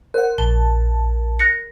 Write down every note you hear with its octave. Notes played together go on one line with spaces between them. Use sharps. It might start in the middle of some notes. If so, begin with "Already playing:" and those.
A#4 C5 F#5
A#1 A5 G7
F#6 A#6 C#7